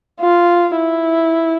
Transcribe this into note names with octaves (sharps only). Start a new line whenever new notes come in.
F4
E4